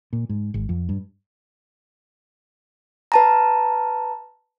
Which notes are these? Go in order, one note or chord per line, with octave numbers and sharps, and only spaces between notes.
A#2
G#2
G#1
F2
G2
B4 A5 A#5